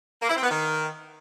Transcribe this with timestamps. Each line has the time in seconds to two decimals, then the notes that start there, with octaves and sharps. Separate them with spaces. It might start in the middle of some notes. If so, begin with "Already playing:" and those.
0.21 A#3
0.28 E4
0.35 C4
0.42 B3
0.49 D#3